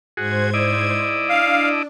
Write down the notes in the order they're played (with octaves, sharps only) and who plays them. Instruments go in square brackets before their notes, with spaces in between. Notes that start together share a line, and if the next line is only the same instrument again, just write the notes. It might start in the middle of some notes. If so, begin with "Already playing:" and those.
[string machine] G#2 C5 G#6 [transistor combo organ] F#4 G#4
[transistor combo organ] E4 D5 D#5
[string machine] D4 [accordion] F5